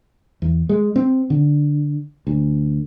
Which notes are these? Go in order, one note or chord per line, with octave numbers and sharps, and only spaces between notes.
E2
G#3
C4
D3
D2